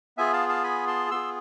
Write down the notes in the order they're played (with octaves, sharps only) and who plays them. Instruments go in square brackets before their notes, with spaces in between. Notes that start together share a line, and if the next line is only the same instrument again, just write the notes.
[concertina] B3 F4 G#4 E5 G#5
F5 A5
F5 A5
G#5 B5
A5 C6
B3 F4 G#4 C6 E6